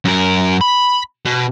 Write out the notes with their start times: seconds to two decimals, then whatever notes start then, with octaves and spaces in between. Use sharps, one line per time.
0.05 F#2 A#4
0.61 B5
1.25 B2